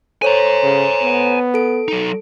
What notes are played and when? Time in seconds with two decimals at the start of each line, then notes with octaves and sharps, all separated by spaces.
0.22 A4 C5 C#5 G#5 A#5
0.63 C#3
1.03 B3
1.54 A4 D7
1.88 F#3 D#4